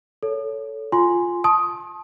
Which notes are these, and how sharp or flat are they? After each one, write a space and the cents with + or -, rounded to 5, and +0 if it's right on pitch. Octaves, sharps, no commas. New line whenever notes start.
A4 +0 C#5 +15
F4 +0 G#5 +0 C6 +0
A5 -20 C6 +35 D#6 +10